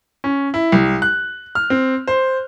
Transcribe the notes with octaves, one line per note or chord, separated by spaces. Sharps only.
C#4
E4
C2
F#6
F6
C4
C5